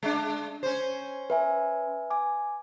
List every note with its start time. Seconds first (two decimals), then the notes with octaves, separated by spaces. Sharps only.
0.03 G#3 D4
0.63 C#4 C5
1.30 B4 E5 G#5
2.10 G#5 D6